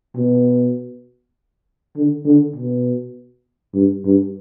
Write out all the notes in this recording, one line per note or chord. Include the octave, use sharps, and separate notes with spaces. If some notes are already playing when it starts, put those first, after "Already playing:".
B2
D3
D3
B2
G2
G2